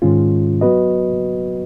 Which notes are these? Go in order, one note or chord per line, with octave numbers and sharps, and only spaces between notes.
G#2 D#3 G#3 C#4 F4
F#3 B3 F#4 B4 D#5